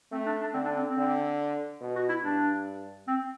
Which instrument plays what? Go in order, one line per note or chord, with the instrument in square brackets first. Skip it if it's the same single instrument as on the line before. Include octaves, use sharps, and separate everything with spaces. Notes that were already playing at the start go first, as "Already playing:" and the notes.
[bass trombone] A3 [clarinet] C4
[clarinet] D4
D4
[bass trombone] D3 [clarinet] C4
[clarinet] D4
C4
C4
[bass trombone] D3
B2
[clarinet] F#4
E4
[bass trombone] G2 [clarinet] D4
[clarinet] C4